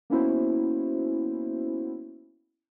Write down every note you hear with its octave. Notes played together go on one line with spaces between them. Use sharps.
A#3 B3 C#4 E4 F#4 C5